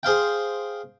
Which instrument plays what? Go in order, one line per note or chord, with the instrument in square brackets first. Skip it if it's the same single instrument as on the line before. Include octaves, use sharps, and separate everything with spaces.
[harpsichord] G#4 C5 F5 G5